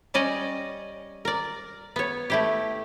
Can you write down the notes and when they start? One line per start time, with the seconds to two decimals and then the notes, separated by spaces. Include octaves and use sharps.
0.14 G3 C#4 D5 D#5
1.25 A#4 D5
1.96 B3 C#5
2.30 A3 E4 G4